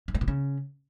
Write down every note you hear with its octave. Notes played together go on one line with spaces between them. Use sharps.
G2
A2
A#2
C#3